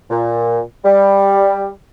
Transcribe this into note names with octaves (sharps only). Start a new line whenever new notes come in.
A#2
G3